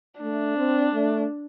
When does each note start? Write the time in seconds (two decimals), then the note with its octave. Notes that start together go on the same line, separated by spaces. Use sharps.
0.20 A3 D4
0.56 C4
0.92 A3